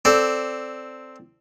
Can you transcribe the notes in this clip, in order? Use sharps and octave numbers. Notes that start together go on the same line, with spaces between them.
C4 A4 D5